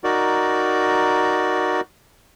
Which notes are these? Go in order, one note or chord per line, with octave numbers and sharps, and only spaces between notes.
D#4 F#4 A#4 D5